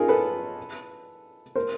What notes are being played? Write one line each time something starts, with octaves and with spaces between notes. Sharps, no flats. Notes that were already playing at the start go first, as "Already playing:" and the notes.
Already playing: C#4 D#4 F4 G#4 A#4
A4 B4
A#4 C5